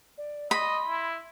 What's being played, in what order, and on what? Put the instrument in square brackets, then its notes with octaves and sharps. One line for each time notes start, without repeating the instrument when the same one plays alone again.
[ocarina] D5
[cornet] D#5 [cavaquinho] B5 [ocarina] C6
[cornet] E4